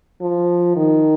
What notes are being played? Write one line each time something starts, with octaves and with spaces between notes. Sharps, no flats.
F3
D#3